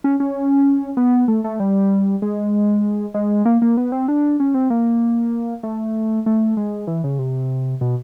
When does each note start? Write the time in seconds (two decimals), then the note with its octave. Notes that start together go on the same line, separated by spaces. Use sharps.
0.04 C#4
0.20 C#4
0.97 B3
1.28 A3
1.44 A3
1.60 G3
2.22 G#3
3.14 G#3
3.45 A#3
3.62 A#3
3.77 B3
3.92 C4
4.08 D4
4.40 C#4
4.54 C4
4.70 A#3
5.63 A3
6.26 A3
6.57 G#3
6.87 E3
7.04 C#3
7.19 C3
7.81 B2